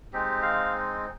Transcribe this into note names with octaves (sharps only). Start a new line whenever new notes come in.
G#3 C4 D#4 G4
F5